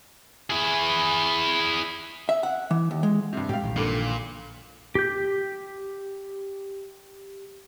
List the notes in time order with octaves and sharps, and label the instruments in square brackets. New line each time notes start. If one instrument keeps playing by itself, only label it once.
[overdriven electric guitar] E4 G#4
[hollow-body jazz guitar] E5
F#5
E3
D#2
G#3
[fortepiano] G2 C3
[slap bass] A2 G3 [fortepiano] G4 F5
[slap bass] A#1 D#3 E3
[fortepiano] G2 D3 [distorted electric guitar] A#2
[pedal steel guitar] G4 G6